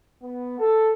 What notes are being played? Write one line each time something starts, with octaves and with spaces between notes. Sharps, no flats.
B3
A4